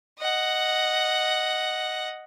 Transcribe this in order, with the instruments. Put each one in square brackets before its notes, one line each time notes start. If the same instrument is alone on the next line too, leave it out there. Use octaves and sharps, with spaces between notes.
[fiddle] D#5 F#5